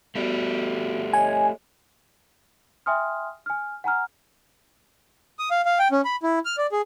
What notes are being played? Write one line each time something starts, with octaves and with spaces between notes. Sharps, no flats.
A3 B3 F#4 G4 D5
C#5 D#5 G#5
E5 G5 G#5 C6 D#6 F6
G#5 F6
F#5 G#5 A#5 F6
D#6
F5
F5
G5
C#4
B5
E4
F6
D5
G#4